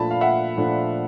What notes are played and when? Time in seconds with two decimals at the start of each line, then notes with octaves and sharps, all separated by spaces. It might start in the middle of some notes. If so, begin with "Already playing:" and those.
Already playing: A#2 F3 A3 D4 A5 B5
0.11 F5
0.21 E5 F#5
0.57 A#2 F3 A3 D4